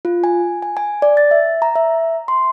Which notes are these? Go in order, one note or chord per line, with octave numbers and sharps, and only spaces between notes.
F4
G#5
G#5
G#5
D5
A6
E5
A#5
E5
C6